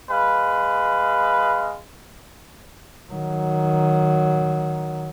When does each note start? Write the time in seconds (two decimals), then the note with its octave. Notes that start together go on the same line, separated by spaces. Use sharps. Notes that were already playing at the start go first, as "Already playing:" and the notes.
0.10 G#3 B4 F5
3.12 D#3 F#3